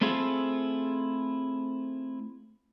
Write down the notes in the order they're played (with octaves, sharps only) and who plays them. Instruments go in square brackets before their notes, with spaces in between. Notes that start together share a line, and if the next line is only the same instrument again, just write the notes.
[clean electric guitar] A3 C4 E4 F4 G#4 A4